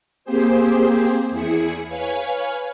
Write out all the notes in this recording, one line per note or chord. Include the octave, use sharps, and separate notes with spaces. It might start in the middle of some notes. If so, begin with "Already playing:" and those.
A#3 C4 G4 G#4 C5
E2 E4 G#4 C#7
B4 C#5 F5 G#5